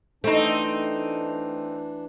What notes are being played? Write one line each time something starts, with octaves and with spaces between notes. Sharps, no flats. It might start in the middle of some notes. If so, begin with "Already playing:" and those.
E3 A3 C4 D4 D#4